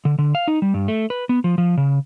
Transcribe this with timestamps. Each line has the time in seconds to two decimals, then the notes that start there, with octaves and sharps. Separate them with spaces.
0.05 D3
0.19 D3
0.35 F5
0.48 D#4
0.62 G3
0.74 G2
0.88 A3
1.10 B4
1.29 B3
1.44 F3
1.58 F3
1.77 C#3